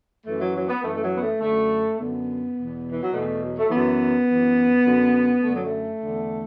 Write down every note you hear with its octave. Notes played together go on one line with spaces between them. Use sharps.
F#2 E3 A3
F#3
F#3
B3
F#2 E3 A3
A3
F#3
B3
A3
F#2 D3 A3
F#2 D3 B3
E2 B2
E3
F#3
E2 B2 A3
F#3
A3
F#2 E3 B3
F#2 E3
F#2 D3
F#2 D3 A3
F#3
A3
E2 D3